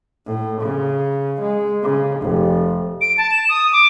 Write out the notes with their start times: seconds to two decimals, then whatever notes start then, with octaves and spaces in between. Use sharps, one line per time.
0.26 A2
0.61 C#3
1.41 G#3
1.83 C#3
2.20 F1
3.01 D7
3.18 A5
3.31 E7
3.49 D#6
3.72 D6